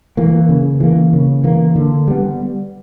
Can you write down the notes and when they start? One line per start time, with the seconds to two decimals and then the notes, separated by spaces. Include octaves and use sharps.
0.17 E3 A#3
0.49 C#3
0.80 E3 A#3
1.13 C#3
1.44 E3 A#3
1.76 D3
2.08 G3 B3